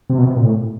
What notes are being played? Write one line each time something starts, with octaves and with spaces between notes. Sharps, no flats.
C3
B2
C3
A#2
A2